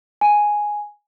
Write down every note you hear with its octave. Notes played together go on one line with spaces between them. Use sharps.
G#5